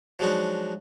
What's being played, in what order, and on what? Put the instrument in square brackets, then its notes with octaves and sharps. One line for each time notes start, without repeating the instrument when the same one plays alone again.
[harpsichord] F3 F#3 G#3 D4 D#4 F#4